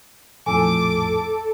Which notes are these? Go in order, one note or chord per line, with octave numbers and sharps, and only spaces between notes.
A#1 F2 A2 A4 G#5 A5 D6